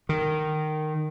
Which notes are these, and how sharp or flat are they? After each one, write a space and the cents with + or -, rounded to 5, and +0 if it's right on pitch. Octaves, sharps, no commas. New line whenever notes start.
D#3 -15